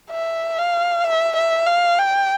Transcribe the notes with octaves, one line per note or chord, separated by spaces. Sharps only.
E5
F5
E5
E5
F5
G5